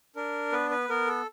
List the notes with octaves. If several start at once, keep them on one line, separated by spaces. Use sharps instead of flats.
D4 A#4
B3 B4
B4
B3 A#4
A4